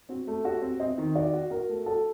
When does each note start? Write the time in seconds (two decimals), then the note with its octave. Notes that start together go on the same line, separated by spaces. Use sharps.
0.09 C4 F#4
0.27 A3
0.45 F#4 G4
0.62 C4
0.80 C4 D#5
0.98 D#3
1.15 F#4 D5
1.33 F#4
1.50 F#4 A#4
1.69 A3
1.86 F#4 A4